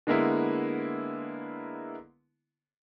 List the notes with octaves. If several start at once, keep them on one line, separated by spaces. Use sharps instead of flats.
D3 G#3 A#3 B3 E4